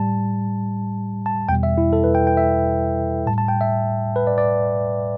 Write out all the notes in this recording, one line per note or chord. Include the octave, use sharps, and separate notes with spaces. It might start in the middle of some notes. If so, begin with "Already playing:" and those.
Already playing: A2 G3 A5
A5
E2 B2 G3 G5
E5
E4
A4
B4
G5
G5
E5
A2 G3 A5
A5
G5
E5
B4
D5
D5